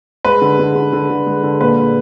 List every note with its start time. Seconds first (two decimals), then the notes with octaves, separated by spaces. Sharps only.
0.25 G#3 B4
0.42 D3
0.59 D3
0.75 D3
0.93 D3
1.10 D3
1.27 G#3
1.43 D3
1.61 A#2 B4
1.78 G#3